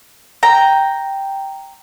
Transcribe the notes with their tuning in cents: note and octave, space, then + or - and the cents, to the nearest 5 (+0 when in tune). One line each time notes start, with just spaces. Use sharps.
G5 +0 A#5 +0